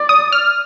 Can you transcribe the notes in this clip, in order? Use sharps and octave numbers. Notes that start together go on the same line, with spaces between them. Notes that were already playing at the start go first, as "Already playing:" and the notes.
Already playing: D5
D#6
F6